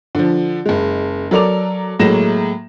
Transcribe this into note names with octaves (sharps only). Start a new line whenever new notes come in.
D3 F3
F#1 G#3
F#3 A4 A#4 D5 D6 F7
A2 F#3 G#3 A#3 A#6 E7